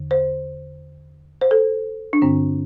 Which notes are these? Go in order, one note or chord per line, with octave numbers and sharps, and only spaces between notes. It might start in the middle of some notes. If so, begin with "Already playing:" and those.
Already playing: E2 D3
C5
C5
A4
D4
G2 D3 C4